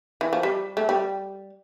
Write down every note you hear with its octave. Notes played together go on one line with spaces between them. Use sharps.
E3
F3
G3
A3
G3